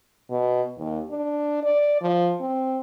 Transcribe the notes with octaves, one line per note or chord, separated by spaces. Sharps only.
B2
D#2
D4
D5
F3
C4